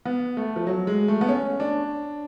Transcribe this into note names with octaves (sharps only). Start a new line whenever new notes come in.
B3
A3
F3
F#3
G#3
A3
B3
C#4
D4